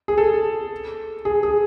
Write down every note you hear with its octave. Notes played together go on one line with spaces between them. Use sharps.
G#4
A4
G#4
G#4